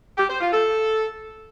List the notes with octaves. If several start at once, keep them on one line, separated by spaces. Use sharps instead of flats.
G4
C5
F4
A4